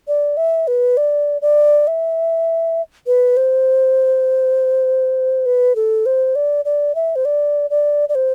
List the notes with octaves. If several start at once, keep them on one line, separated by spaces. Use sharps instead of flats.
D5
E5
B4
D5
D5
E5
B4
C5
B4
A4
C5
D5
D5
E5
C5
D5
D5
D5
C5